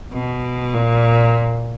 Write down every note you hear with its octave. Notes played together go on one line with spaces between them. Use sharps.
B2
A#2